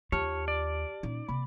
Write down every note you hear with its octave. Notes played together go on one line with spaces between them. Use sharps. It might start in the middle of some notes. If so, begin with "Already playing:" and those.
D#2 F4 G4 C#5 A5 F6
D5
A#2 C#4 D#4
C3 A#3 B5